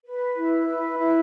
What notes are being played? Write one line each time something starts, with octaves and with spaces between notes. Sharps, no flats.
B4
E4
B4
E4